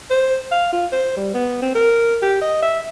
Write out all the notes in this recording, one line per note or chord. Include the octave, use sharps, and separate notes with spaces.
C5
F5
F4
C5
G3
B3
C4
A#4
G4
D#5
E5